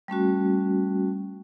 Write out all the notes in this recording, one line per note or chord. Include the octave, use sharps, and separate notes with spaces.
G3 A3 C#4 F#4